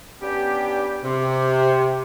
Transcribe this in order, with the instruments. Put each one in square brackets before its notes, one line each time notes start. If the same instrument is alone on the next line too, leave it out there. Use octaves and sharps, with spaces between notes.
[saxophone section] B3 C#4 D4 G4
C3